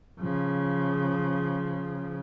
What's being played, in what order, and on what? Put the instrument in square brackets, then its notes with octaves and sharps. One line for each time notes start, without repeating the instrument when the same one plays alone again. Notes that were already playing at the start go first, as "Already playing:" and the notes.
[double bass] C#3 F3